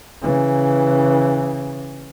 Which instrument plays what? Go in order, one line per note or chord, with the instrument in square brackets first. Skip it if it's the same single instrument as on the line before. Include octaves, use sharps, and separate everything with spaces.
[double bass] C#3 E3